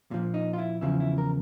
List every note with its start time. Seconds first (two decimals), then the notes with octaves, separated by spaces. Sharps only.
0.11 A#2 F3
0.34 D#4
0.53 F4
0.58 E4
0.81 E2 C#3 F3 E4
1.00 E4
1.18 A#4